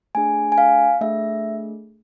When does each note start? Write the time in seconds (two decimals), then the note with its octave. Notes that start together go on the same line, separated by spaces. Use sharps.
0.15 A3 D4 G#4 G#5
0.52 G#5
0.58 F5
1.01 A3 D4 G#4 E5